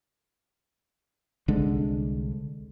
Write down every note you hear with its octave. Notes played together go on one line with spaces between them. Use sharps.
C2 D3 G#3 D4